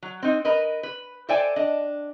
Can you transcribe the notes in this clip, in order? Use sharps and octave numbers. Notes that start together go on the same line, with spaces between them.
F#3
C4 D#4
A#4 B4 D#5
B4
A4 C5 D5 E5 G5 G#5
D4 D#5